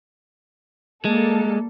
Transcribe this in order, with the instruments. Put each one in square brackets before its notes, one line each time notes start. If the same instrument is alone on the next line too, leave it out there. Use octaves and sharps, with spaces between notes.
[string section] G3 A#3 A4 [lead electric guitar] G#3